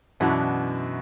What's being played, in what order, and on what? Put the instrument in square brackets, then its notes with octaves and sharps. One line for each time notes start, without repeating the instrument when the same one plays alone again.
[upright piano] F#2 B2 [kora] E3 B3 D4 F#4